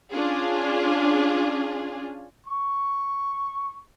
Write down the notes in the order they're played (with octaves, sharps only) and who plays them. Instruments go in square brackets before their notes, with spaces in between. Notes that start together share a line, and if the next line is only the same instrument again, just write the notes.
[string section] C#4 D4 F4 G#4
[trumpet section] C#6